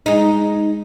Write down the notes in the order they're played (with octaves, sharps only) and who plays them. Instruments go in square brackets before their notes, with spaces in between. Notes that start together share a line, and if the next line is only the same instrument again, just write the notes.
[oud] G#3 D#4